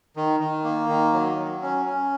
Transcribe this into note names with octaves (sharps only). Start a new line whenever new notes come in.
D#3
D#3
A#3
D#3
F#3
F#3
C#4
C#4